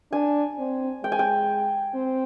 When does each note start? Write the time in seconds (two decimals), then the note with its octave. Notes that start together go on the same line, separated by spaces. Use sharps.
0.12 D4 G#5
0.58 C4
1.03 G#3 G5
1.12 G#5
1.19 G5
1.94 C4